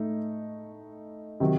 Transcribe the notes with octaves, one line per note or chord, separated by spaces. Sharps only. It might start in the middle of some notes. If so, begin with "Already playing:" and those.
Already playing: A2 A3 D#4
C3 D#3 F#3